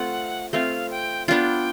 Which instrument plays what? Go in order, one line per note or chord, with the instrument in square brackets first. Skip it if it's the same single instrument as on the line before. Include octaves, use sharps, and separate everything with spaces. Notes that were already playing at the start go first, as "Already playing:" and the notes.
Already playing: [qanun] A3 C4 F4 [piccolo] F#5
[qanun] A3 C4 F4 [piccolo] F5
[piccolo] G5
[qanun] B3 D4 F4 [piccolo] G5